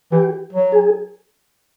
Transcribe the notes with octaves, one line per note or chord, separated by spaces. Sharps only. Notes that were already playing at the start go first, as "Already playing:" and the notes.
E3 G4
F#3
G#4